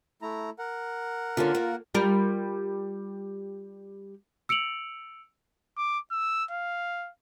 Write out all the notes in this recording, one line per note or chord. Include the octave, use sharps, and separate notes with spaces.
A3 E4 A#5
A#4 F#5
D3 A#3 C#4 F4
A#3
G3 F4 A#4
E6 C#7 D7 F7 F#7
D6
E6
F5